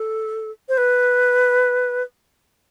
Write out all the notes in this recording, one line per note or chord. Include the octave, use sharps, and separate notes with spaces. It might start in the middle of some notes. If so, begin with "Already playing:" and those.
Already playing: A4
C5
B4